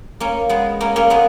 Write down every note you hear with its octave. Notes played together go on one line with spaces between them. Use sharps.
A#3 C#4
G#3 B3
A#3 C#4
A#3 C#4
G#3 B3